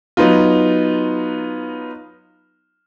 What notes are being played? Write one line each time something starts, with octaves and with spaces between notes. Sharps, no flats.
F#3 B3 D#4 F4